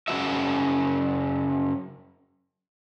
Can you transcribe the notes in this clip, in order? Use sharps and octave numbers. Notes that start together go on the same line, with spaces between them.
F#2 C#3 F3 F#4 E5